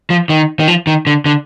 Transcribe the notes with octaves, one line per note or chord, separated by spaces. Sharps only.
F3
D#3
D#3
F3
D#3
D3
D3